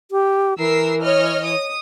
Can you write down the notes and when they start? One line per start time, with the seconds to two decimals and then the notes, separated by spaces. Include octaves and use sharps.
0.11 G4
0.59 E3 A#4 E6 C7
1.03 C#5 D#5 F6
1.46 D#6